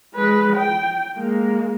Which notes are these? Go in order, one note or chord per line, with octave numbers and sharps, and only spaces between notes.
G#3 B4
G5
G#3 A#3